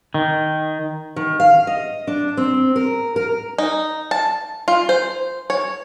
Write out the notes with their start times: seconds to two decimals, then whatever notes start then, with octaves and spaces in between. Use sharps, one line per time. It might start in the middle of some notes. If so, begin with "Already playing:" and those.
0.14 D#3
1.16 D#3
1.40 F5
1.67 D#5
2.07 D4
2.37 C4
2.76 A#4
3.16 A#4
3.58 D#4
4.11 A5
4.68 F4
4.89 C5
5.50 C#5